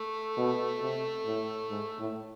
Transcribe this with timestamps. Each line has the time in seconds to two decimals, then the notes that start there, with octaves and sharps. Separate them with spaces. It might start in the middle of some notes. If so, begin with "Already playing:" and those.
Already playing: A3
0.38 B2
0.81 C3
1.26 A2
1.70 G#2
1.99 A2